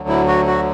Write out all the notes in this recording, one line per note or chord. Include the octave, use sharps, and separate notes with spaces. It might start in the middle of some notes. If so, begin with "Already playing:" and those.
Already playing: D2 D3 F#3
E4
F#4
F#4